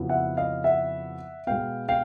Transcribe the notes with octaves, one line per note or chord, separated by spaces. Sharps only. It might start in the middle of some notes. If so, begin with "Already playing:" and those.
Already playing: F2 C#3 F#3 B3 E4
E5 F#5
D#5 F5
E5 F#5
B2 G#3 B3 F5 G5
F5 G5